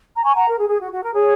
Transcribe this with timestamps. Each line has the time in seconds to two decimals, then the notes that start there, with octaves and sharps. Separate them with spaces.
0.15 A#5
0.24 G#5 C#6
0.35 F#5 A#5
0.47 A#4
0.58 G#4
0.69 G#4
0.80 F#4
0.92 F#4
1.03 A#4
1.14 G#4 C#5